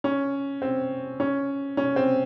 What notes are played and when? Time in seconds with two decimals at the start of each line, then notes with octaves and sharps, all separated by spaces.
0.04 C#4
0.62 C4
1.20 C#4
1.77 C#4
1.96 C4